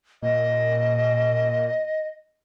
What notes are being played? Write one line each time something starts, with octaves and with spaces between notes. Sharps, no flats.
A#2 D#5